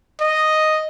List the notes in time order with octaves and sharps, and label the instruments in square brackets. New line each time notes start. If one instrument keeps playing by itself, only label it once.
[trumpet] D#5